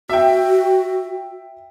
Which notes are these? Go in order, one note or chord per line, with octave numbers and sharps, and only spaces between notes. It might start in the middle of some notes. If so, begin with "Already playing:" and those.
F#4 E5 G5